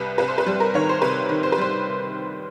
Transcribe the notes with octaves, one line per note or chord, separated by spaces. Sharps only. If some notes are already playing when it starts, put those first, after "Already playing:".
Already playing: C2 C3 G3 B4
C2 B4
C5
B4
G3
A#4
D#3 C#5
C5
C3 B4
D#3
C5
B4
G3 C5